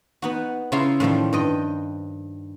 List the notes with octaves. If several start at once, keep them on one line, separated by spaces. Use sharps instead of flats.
B3 D#4 F#4
C#3 E4 F4 C#5 A#5 C6
A2 D#3 F3 G3
G2 D#5 G5